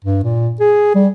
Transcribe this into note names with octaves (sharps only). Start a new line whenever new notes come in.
G2
A#2
G#4
G3